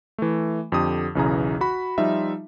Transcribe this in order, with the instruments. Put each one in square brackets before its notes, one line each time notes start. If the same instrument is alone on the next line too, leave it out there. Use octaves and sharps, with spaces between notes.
[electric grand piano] E3 A3
F2 D3 G4 D#6
B1 E2 C#3 E3 G#4 A#5
F#4 B5
F3 G3 D#4 F4 E5